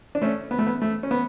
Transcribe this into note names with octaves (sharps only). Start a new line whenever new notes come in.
D4
A3 C#4
B3
A3
B3
A3
C#4
B3